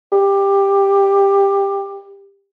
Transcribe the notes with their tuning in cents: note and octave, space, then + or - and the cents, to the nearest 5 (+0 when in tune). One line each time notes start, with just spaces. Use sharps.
G4 +15